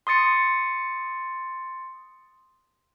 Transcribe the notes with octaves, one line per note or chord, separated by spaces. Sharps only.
C6 D#6 A6 C#7